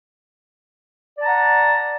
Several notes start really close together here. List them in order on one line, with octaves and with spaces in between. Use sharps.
D5 A5 A#5 F#5